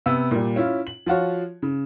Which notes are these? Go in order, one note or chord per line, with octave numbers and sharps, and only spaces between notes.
C3 B3 E6
A#2 G3
C#4 E4 F4
F#7
F3 F4 F#4 C#5
C#3